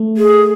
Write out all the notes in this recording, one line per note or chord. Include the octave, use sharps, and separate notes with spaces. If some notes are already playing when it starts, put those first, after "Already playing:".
Already playing: A3
G#4